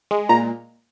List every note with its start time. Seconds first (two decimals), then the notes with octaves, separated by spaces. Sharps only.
0.11 G#3
0.29 A#2 A#5